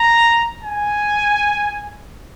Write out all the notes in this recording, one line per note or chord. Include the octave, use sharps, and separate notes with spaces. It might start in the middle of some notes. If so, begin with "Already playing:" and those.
Already playing: A#5
G#5